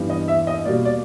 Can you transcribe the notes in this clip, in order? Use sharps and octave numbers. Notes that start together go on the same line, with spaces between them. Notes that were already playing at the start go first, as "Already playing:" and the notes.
Already playing: G2 E3 G3 B3
D#5
E5
D#5
B2 G3 A#3 D5
D5